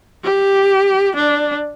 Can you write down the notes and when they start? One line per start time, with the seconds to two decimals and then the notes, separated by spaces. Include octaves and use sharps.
0.23 G4
1.16 D4